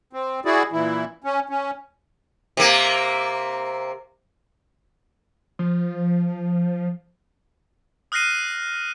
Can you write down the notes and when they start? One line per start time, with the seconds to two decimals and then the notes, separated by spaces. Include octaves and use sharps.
0.13 C4
0.45 E4 F#4 G#4 D5
0.72 A#2 E3 E4
1.24 C#4
1.49 C#4
2.57 C3 A#3
5.59 F3
8.12 D#6 F6 F#6 A#6 C7 D#7